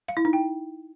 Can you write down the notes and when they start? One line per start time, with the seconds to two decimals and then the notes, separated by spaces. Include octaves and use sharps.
0.08 F5
0.17 E4
0.25 D#4
0.33 G5